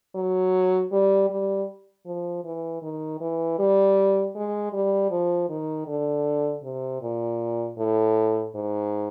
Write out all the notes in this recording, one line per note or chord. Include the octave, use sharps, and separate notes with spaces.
F#3
G3
G3
F3
E3
D#3
E3
G3
G#3
G3
F3
D#3
D3
C3
A#2
A2
G#2